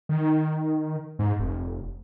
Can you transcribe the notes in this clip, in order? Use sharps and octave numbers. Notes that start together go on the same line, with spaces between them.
D#3
G#2
F1